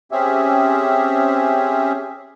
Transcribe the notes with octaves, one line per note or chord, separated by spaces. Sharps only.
C4 C#4 G4 G#4 E5